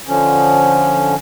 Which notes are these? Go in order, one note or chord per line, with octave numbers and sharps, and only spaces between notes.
D3 F3 C#4